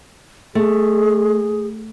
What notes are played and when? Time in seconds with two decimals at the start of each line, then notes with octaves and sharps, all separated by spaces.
0.55 A3 G#4